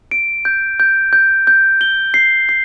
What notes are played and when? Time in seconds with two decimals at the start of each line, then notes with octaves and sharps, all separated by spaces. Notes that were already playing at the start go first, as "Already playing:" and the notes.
0.11 D7
0.45 G6
0.80 G6
1.13 G6
1.47 G6
1.81 G7
2.14 C7
2.49 C7